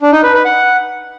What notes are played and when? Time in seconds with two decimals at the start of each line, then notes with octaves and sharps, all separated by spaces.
0.01 D4
0.12 D#4
0.23 B4
0.34 B4
0.45 F#5